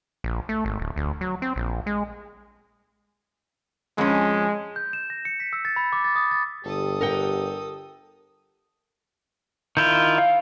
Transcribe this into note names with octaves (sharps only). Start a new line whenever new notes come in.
A#1
A3
G#1
D1
D2
F#3
C4
A#1
G#3
F2 G#3 C#4
G6
E7
A#6
C#7
B6
E6
A6
B5
D6
A6
D#6
A6
G1 G4 A4 D#6
A#4 F#5 G5
D#3 E4 F4 G6
F5